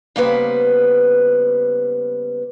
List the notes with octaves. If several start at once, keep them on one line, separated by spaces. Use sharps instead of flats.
C#3 G3 A#3 B3 B4 C5